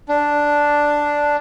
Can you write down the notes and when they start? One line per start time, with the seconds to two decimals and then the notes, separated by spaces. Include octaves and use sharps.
0.09 D4